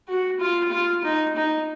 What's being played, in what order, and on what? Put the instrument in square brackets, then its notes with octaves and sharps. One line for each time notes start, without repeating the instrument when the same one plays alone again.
[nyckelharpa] F#4
F4
F4
D#4
D#4